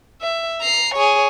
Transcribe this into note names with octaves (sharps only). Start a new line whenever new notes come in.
E5
A#5 C7
G#4 C#5